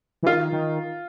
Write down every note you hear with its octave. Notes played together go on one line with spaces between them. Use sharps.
E3
D#3 F4
D#3